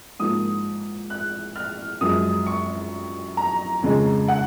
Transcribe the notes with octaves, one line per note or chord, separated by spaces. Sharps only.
G#2 F3 A#3 D#6
F#6
F6
F#2 F3 G#3 D#6
C#6
A#5
F2 C#3 G#3
F#5